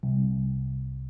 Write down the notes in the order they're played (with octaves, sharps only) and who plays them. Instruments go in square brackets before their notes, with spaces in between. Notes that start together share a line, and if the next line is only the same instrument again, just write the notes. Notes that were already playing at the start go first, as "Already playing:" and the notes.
[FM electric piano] C2